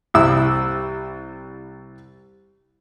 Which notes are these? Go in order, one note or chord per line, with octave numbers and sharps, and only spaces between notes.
C2 G3 E4 E6